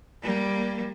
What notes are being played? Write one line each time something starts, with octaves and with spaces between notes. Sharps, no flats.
G3 A#3